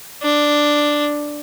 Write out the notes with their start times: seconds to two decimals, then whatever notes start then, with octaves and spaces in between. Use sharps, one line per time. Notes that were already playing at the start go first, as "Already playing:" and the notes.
0.23 D4